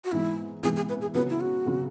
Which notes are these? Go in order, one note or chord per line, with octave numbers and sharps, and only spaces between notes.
F#4
G#2 E3 B3 E4
G#2 E3 B3 G#4
G#4
B4
G#4
C#3 F#3 B3 B4
E4
F#4
C#3 F#3 B3